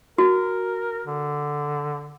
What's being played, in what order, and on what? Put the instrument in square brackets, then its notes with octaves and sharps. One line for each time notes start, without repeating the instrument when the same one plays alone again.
[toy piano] F#4 [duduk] A#4
[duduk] D3